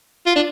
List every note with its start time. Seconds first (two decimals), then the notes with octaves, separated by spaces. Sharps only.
0.27 F4
0.36 D4